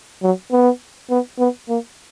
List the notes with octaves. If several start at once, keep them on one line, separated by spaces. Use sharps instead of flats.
F#3
B3
B3
B3
A#3